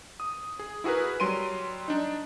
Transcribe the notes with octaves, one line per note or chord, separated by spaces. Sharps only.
D#6
G#4
E4 F#4 G#4 A#4 B4
F#3 G3 C6 D7 D#7
D4 D#4